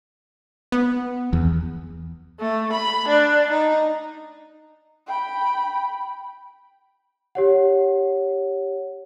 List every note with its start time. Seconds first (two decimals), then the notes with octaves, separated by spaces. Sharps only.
0.72 B3
1.33 E2
2.40 A3
2.73 B5
3.09 D4
3.51 D#4
5.07 G5 B5
7.35 G4 C#5 F#5